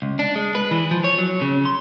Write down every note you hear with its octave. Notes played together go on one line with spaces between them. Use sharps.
C#2
D4
G#3
B4
E3
F3
C#5
F#3
C#3
C6